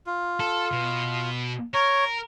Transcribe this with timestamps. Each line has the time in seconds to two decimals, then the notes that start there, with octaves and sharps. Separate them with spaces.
0.06 F4
0.40 A4
0.72 B2
1.74 A#4 C#5